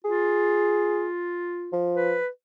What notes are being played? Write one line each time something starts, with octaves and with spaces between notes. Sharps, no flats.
F4 G#4
F3
B4